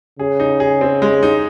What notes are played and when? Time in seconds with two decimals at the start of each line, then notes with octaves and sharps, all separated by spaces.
0.19 C#3 G#4
0.40 D#4
0.60 G#4
0.81 C4
1.02 G#3
1.23 D#4